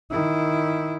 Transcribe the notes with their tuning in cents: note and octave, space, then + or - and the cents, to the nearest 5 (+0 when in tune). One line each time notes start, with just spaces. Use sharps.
D#3 +0 E4 +0